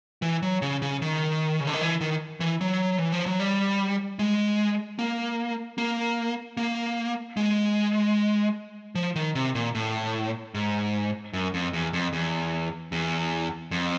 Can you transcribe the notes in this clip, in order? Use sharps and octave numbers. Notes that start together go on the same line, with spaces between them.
E3
F#3
C#3
C#3
D#3
C#3
D3
D#3
E3
D#3
E3
F#3
E3
F3
F#3
G3
G#3
A#3
A#3
A#3
G#3
F3
D#3
C3
A#2
A2
G#2
F#2
F2
E2
F2
E2
E2
F2